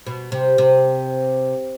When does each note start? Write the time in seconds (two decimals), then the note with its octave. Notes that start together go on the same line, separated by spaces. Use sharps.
0.06 B2
0.32 C3
0.58 C3